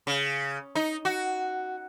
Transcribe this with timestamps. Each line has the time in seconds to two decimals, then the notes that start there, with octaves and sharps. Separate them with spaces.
0.07 C#3
0.75 D#4
1.05 F#4